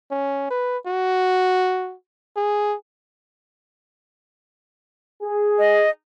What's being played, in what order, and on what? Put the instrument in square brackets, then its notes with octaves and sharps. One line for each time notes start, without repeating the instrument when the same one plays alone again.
[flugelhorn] C#4
B4
F#4
G#4
[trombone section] G#4
[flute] D#5